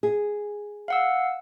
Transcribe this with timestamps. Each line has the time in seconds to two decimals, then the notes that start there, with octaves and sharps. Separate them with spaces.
0.03 G#4
0.88 F5 F#5 E6